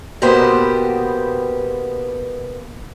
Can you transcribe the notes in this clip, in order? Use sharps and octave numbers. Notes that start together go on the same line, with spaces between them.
B2 A#3 B3 G4 C5 A5